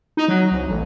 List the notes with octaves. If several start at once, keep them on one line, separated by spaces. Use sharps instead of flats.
D#4
F#3
C2
A1